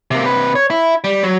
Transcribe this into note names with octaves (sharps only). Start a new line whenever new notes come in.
C3 A#3
C3 B4
C#5
E4
G3
F#3